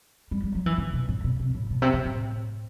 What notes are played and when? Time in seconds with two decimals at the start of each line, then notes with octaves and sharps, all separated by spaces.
0.31 G3
0.43 G3
0.55 F#3
0.66 E3
0.78 D3
0.93 B2
1.09 A2
1.24 B2
1.39 C3
1.55 A2
1.70 B2
1.82 C3
1.93 C3
2.05 A2